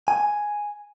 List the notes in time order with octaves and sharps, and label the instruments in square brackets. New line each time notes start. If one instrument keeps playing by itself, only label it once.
[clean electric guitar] G#5